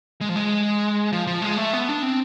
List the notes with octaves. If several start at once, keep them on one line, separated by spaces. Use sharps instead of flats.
G#3
F3
G#3
F3
F3
G#3
A3
B3
D4
C4